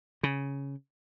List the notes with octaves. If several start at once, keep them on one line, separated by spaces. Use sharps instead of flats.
C#3